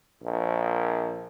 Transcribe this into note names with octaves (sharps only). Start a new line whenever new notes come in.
A#1